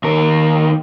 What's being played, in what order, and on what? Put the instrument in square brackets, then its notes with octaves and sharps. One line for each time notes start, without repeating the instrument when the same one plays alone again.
[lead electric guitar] D#2 A#4